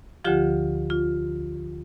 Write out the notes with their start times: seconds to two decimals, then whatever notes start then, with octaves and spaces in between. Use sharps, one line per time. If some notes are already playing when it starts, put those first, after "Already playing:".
0.25 D2 D3 F3 F4 G4
0.90 F4